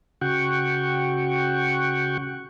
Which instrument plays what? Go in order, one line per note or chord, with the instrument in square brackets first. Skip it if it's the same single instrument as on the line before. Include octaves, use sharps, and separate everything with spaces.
[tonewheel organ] C#3 F#4 F#5 G5 C#6